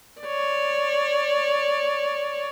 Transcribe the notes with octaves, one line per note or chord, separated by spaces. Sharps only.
C#5 D5